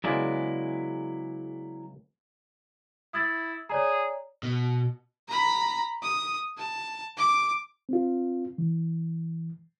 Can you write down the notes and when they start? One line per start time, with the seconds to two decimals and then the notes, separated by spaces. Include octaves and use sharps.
0.04 C#3 F#3 G#3 B3 E4 D5
3.14 E4 D#6 G#6 A6
3.70 G#4 C#5 D5 A#5
4.43 B2
5.28 A#5 B5
6.02 D#6
6.57 A5
7.17 D6
7.89 C4 F4
8.58 E3